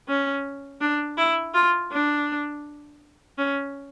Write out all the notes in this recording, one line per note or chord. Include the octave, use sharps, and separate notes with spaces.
C#4
D4
E4
F4
D4
C#4